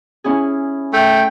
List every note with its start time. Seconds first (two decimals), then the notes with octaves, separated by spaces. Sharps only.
0.24 C#4 E4 G#4
0.93 A3 G5